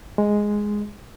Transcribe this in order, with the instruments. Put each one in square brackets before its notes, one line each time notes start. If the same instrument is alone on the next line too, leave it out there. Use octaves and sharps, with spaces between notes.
[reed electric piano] G#3